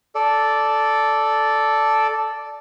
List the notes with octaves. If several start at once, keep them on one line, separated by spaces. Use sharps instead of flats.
A4 D5